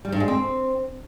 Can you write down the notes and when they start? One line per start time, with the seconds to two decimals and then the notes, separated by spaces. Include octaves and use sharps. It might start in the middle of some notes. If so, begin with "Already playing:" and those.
0.05 G3
0.12 G2
0.20 G#3
0.28 C4